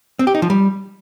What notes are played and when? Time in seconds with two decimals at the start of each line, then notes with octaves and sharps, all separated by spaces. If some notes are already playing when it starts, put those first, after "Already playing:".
0.19 C4
0.27 G4
0.35 D#4
0.42 F3
0.50 G3